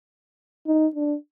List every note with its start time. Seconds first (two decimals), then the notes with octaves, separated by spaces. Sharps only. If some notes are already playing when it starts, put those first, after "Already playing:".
0.67 D#4
0.95 D4